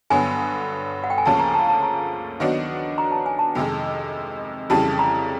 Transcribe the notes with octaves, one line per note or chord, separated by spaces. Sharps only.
G2 D3 F#3 B3 G#5
F#5
G5
G#5
D2 C#3 F3 A#3 C#4 A5
A#5
A5
A5
A#5
D#3 F#3 B3 D4 F#4
A#5
A5
G#5
A5
F2 C3 D#3 G#3
F2 C#3 E3 G3 A5
A#5